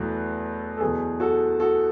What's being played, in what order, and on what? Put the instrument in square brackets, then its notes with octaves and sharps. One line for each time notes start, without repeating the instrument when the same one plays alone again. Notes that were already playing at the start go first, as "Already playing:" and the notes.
Already playing: [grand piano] E2 B2 F#3 A3
A4
E2 B2 F#3 G#4
F#4 A4
F#4 A4